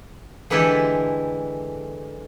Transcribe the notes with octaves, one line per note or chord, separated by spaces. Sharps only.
D3 E3 G#3 E4 G4 A4